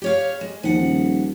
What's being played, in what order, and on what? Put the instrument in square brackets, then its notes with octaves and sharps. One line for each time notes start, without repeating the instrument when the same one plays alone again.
[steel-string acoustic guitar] G4 C#5 F5
G#3
[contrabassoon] D#2 [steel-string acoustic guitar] F3 F#5
[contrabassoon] D#1